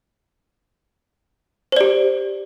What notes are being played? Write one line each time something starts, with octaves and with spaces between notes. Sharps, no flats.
G4 C5 D5